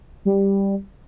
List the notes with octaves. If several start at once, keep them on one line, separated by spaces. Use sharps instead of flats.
G3